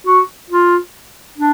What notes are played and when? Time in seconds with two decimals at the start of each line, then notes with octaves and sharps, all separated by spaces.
0.07 F#4
0.50 F4
1.38 D4